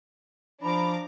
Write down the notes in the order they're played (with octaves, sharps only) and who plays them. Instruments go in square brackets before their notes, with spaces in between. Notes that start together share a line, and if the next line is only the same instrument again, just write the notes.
[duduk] F3 [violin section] D4 A#5 D6 [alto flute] B5